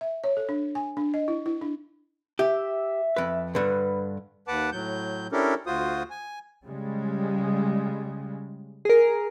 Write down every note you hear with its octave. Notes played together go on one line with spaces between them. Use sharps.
E5
C#5
A4
D4
G#5
D4
D#5
E4
E4
D4
G4 E5
F2 B4
G2 D3 B4
D#2 B4 F#5 A5 D6
A2 F#3 G6
C#4 D4 E4 G4 A4 A#4
D2 F4 F#4 C5 D#6
G#5
C#3 G3 G#3
G#4 A#4